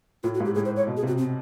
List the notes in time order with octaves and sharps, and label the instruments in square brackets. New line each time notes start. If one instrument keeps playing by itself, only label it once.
[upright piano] A2 [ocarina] F4
[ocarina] F#4
[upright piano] G#2
[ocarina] G4
[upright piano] A2 [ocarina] G#4
[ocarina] C5
C#5
[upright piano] B2
[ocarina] G#4
[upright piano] C3 [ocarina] F#4
[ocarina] C4